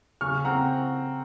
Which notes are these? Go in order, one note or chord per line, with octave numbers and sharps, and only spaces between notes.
C#3 C#6 F6
C4 F#5 A#5